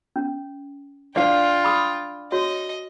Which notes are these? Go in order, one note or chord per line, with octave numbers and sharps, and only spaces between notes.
C#4
D4 F4 D5 F5 G5
B5 D6 D#6
F#4 C#5 D#5